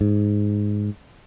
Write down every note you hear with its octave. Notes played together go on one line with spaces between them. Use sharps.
G#2